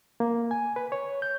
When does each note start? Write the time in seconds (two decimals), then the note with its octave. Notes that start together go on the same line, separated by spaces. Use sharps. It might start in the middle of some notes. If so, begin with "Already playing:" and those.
0.20 A#3
0.51 G#5
0.76 B4
0.92 C#5
1.22 G6